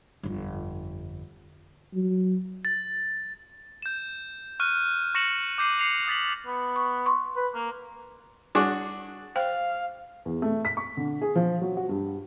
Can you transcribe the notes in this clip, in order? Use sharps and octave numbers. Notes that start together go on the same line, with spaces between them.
G1 F2
F#3
A6
G6 E7
C#6 F6 F#6 D#7
C#6 A#6 C#7 E7 F#7
D6 G6 C7 D#7 F#7
C7 C#7 F7
D#6 A6 B6 F#7
B3
C#6
C6 C#6
B4
A#3
G3 D4 F#4 G#4 C#6 D6
C5 F5 G5
E2
A3
B6
C#6
D3
G#4
F3
F#3
F#4
G2